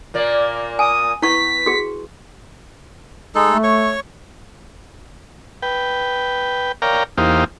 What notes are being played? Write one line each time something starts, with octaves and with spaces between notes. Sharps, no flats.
A#2 A#3 D5
G#5 D#6
B3 E4 C#6 B6
F#4 G#4
G#3 D#4 A4
A3
C#5 C#6
B4 G5
A#4 C#5 D5 F5 G5 A#5
E2 A#3 D#4 G4 C5 F5